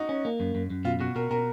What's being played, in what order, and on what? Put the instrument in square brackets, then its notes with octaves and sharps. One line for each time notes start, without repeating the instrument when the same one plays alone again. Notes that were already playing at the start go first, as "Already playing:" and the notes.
Already playing: [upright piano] D#4 F#4
[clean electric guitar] C#4
A#3
F#2
F#2
F#2
[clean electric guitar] B2 [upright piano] F4
[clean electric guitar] B2 [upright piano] F#4
[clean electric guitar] B2 [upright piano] A#4
[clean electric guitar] B2 [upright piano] A#4